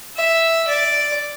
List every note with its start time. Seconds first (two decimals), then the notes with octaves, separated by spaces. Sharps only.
0.16 E5
0.68 D5